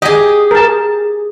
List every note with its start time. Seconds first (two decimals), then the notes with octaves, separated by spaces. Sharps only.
0.02 G4 G#4 D#5
0.51 A#4 A5